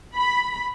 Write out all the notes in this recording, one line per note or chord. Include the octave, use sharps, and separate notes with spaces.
B5